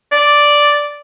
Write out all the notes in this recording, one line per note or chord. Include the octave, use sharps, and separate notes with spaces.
D5